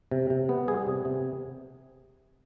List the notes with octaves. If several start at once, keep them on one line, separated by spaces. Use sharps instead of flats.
C3
C3
B3
G3 G#4
C3
C3